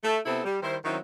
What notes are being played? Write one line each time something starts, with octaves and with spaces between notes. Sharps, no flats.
A3
C3 B3 C4 E4 A4
G3
D#3 G3 E4 C5
D#3 F#3 C4 C#4 D#4 E4